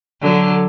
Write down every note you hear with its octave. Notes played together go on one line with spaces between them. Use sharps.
D3 F#3